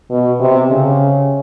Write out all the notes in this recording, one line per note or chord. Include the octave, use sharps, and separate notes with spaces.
B2
C3
C#3